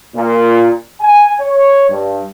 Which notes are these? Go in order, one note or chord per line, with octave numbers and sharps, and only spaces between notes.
A#2
G#5
C#5
G2